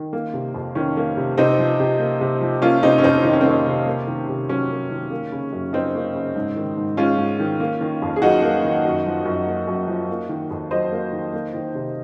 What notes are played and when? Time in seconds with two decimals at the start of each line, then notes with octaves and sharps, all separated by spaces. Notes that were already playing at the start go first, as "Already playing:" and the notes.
Already playing: D#3
0.13 A#3
0.34 C3
0.54 F2
0.75 D#3 C#4
0.97 A#3
1.17 C3
1.38 C3 C4 D#4
1.59 F3
1.80 C3
1.99 A#3
2.21 C3
2.41 F3
2.62 A#3 C#4 F4
2.83 C3 C4 D#4
2.98 C#4
3.03 F2 C4 D#4
3.24 D#3 D#4
3.33 C#4
3.41 C4
3.45 A#3
3.50 C#4
3.66 C3
3.86 A#3
4.07 D#3
4.29 C3
4.49 F#3 C#4
4.70 A#3
4.91 D#3
5.11 A#3
5.32 C#3
5.53 F#2
5.73 F3 C4 D#4
5.95 A#3
6.16 C#3
6.36 G#2
6.56 D#3
6.77 G#2
6.97 G#3 C#4 F4
7.18 G#2
7.39 D#3
7.60 A#3
7.81 D#3
8.02 F2
8.16 G#4
8.22 F#3 D#4 F#4
8.43 A#3
8.64 D#3
8.85 F#2
9.06 F3
9.26 F#2
9.46 A#3
9.67 F#2
9.88 F3
10.09 A#3
10.29 D#3
10.51 F2
10.71 F#3 C5 D#5
10.92 A#3
11.12 D#3
11.33 A#3
11.54 D#3
11.75 C3